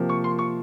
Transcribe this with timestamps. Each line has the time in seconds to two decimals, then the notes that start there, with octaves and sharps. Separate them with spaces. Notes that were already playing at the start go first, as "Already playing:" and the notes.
Already playing: C3 F3 A#3
0.09 C#6
0.24 C6
0.39 C#6